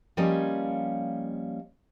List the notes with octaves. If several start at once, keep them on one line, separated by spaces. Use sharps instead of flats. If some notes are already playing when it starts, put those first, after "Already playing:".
F3 G3 A#3 C#4 C#5 D#5